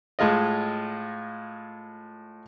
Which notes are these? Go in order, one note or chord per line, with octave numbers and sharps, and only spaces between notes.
A2 G#3 F4 D#5